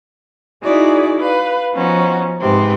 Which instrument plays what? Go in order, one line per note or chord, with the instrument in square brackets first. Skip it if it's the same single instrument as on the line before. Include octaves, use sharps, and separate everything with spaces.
[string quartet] D#4 E4 F#4 G#4 D5
B4 F5
F3 B3 C#4 D#4 F#4
G#2 C3 C4 B4